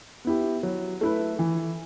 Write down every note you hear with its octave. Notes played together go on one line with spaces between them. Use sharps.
B3 E4 G4
F#3
A3 E4 B4
E3